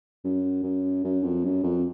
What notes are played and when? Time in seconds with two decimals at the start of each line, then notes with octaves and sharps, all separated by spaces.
0.24 F#2
0.63 F#2
1.04 F#2
1.23 F2
1.44 F#2
1.63 F2